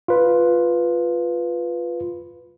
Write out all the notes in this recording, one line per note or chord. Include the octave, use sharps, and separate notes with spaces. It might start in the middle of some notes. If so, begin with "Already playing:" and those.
F4 B4